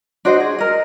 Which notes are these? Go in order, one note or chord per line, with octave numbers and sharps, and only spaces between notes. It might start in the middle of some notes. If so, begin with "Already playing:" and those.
D4 F#4 C5 D#5
G#4
A#4 D#5